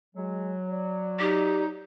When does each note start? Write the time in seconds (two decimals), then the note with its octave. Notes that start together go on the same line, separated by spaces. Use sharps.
0.15 F#3 G#3
0.70 D5
1.20 D#4 G4